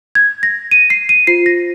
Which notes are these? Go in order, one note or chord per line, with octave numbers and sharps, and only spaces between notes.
G#6
A#6
D#7
C7
D#7
F4 C5 C7
A#6